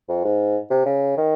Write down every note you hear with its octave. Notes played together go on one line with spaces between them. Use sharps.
F2
G#2
C3
C#3
D#3